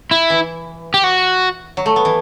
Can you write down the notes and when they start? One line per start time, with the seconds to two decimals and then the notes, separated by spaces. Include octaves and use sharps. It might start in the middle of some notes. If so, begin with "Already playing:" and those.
0.11 E4
0.30 E3
0.94 G4
1.04 F#4
1.77 F#3
1.86 A3
1.96 B3
2.05 E3